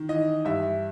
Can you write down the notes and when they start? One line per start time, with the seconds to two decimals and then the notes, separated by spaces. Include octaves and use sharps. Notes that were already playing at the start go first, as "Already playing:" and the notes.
Already playing: D#3
0.09 E3 D#5
0.45 G2 E5